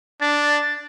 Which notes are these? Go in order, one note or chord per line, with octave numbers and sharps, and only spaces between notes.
D4 A6